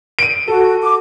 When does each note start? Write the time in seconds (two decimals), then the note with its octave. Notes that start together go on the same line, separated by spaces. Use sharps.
0.19 D7 D#7
0.48 F#4 A4
0.83 D6